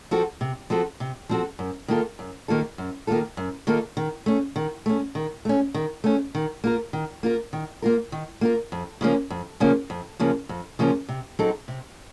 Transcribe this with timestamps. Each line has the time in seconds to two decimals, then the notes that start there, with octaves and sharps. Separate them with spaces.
0.11 F3 C4 F#4 A4
0.41 C3
0.70 F3 C4 F#4 A4
1.00 C3
1.29 F3 C4 F#4 A4
1.59 F#2
1.88 D#3 A#3 F4 A4
2.19 F#2
2.48 D#3 A#3 F4 A4
2.78 F#2
3.07 D#3 A#3 F4 A4
3.37 F#2
3.67 D#3 A#3 F4 A4
3.97 D#3
4.26 A3 C#4
4.56 D#3
4.86 A3 C#4
5.15 D#3
5.45 A3 C#4
5.74 D#3
6.04 A3 C#4
6.35 D#3
6.64 A#3 F4 A#4
6.93 D#3
7.23 A#3 F4 A#4
7.53 D#3
7.82 A#3 F4 A#4
8.12 D#3
8.41 A#3 F4 A#4
8.72 F2
9.01 C#3 F3 A#3 C#4
9.30 F2
9.60 C#3 F3 A#3 C#4
9.90 F2
10.19 C#3 F3 A#3 C#4
10.49 F2
10.79 C#3 F3 A#3 C#4
11.09 C3
11.39 F#3 C4 D#4 A4
11.68 C3